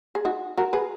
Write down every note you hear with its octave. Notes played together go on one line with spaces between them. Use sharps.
G#4
D#4 F#4
F#4 A#4
G#4 B4